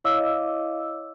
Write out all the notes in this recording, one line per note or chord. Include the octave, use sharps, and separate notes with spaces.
E4 C#5 D#5 F5 D6 E6